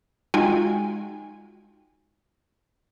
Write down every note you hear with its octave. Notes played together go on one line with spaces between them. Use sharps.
G#3 D#4 F4 F#4 G5 G#5